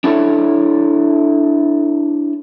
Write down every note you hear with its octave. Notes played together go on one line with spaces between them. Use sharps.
D4 E4 A4 C#5